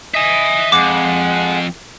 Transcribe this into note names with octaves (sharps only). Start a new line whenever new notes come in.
D#5 E5 G#5
F2 G#3 F#5 D6 F#6